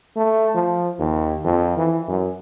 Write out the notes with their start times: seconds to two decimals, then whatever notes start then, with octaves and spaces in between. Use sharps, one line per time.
0.16 A3
0.55 F3
0.99 D#2
1.44 F2
1.77 E3
2.08 F#2